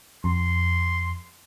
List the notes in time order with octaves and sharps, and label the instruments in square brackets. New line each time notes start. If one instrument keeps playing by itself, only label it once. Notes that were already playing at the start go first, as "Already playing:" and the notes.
[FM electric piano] F2 [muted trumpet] C6